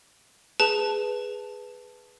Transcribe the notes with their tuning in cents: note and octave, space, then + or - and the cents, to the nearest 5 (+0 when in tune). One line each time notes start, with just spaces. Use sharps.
G#4 +0 B4 +0 A5 +0